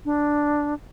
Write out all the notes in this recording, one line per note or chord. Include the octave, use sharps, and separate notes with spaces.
D4